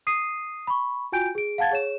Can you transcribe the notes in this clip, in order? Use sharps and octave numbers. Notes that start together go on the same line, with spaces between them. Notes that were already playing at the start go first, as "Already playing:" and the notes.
D#6 C7 D#7
B5 C#6
F4 F#4 G5 G#5 G6 D7
G#4 D7
F5 F#5 A5 G#6 A6
G#4 C#5 E7